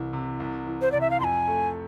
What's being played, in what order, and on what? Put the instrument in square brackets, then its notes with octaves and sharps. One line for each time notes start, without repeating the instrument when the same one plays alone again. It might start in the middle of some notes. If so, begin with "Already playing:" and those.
Already playing: [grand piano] C2 E3
C3
C2
E3
[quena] C5
[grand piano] C3 [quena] D5
[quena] E5
F5
[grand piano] F2 [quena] G#5 C6
[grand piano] A3